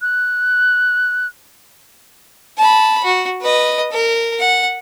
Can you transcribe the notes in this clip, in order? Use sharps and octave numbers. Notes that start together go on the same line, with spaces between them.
F#6
A5 B5
F#4
B4 D#5
A#4
F#5